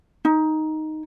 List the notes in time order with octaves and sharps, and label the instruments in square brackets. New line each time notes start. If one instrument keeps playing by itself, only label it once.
[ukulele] D#4